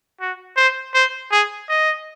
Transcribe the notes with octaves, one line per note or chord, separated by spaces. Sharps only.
F#4
C5
C5
G#4
D#5